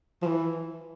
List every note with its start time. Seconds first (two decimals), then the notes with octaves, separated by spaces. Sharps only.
0.22 F3
0.26 E3